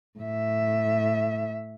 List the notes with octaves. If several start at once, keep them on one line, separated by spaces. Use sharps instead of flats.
A2 E5